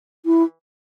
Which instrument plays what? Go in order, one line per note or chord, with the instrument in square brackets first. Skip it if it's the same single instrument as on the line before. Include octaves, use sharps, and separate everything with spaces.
[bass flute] E4